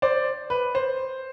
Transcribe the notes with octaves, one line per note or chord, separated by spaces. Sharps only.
C5 D5
B4
C5